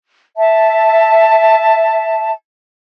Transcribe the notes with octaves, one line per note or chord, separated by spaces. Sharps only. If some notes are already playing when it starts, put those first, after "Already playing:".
E5 A5